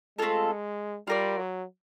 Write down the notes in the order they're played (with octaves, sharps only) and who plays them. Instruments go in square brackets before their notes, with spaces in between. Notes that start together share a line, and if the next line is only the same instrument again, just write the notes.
[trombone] G#3 [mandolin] A3 C4 F4 A4
[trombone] G3 [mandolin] F4 A#4 D5
[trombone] F#3